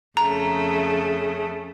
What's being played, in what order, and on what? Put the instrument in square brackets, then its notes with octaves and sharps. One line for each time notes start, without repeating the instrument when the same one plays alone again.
[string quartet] F2 C#3 A3 [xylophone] A#5